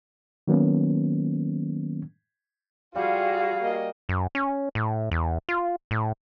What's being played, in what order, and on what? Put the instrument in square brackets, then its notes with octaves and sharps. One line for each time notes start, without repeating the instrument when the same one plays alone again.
[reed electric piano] D#3 F#3 A#3 B3 C#4
[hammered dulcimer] G3 [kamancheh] F4 [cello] F#4 G#4 [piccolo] F5
[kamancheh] A#3 D#5
[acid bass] F#2
C#4
A2
E2
F4
A2